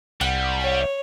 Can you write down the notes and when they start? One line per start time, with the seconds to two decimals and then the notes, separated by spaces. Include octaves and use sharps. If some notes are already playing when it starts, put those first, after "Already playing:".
0.21 C2 G3 F#5
0.61 C#5